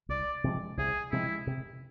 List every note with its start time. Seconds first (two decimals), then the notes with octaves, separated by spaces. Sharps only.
0.09 C2 D5
0.44 C3 F3 G#3
0.77 C2 G#4
1.11 C3 F3 G#3 E4
1.47 C3